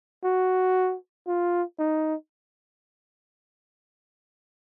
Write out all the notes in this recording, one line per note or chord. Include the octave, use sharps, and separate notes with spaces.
F#4
F4
D#4